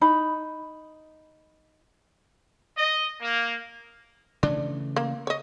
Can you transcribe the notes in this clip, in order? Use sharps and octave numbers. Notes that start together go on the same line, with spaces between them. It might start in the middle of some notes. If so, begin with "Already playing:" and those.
D#4 B5
D#5
A#3
C#3 E3 A3 D4
A#3
C#5 D#5